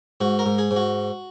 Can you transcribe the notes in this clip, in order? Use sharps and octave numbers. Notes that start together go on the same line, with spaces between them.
G#2 F#4
A#4
G#2
G#4
G#2
F#4